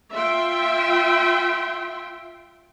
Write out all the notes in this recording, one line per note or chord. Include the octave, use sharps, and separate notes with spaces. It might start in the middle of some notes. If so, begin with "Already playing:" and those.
F4 E5 G5 C6